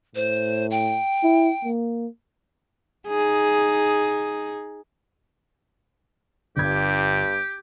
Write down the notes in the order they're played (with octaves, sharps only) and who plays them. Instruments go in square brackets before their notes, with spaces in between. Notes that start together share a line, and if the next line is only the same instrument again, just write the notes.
[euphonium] A2 [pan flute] C5
[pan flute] G5
[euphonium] E4
A#3
[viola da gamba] D#4 G#4
[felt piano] G1 G#6 [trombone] G2 [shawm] G4